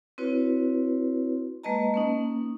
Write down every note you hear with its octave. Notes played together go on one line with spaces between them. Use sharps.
C4 E4 F#4 B4 C#5
G#3 A#3 B4 D#5 A5 A#5
A#3 C#4 D#4